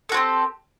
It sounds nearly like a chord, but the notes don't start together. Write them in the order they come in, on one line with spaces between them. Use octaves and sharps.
A4 F#4 C4 G4